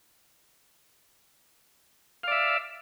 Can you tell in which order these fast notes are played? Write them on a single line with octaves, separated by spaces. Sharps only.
F5 D5 E5